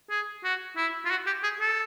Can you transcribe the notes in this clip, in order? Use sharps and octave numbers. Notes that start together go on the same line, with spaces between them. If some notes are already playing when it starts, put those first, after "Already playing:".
G#4
F#4
E4
F4
F#4
G4
G#4
A4